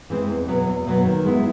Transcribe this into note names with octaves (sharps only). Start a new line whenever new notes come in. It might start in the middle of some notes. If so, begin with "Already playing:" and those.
E3 G#3 C4
E2
B2 F#3 B3
E2
B2 F#3 B3
D#3
G#3 B3 E4